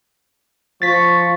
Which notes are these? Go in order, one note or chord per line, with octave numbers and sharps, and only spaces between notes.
F3 C#6 A6 B6